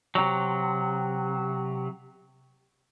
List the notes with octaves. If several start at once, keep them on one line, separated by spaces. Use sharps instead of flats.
C3 F#3